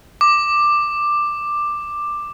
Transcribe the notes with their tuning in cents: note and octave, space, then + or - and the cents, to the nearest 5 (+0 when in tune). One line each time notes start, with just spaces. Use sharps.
D6 +10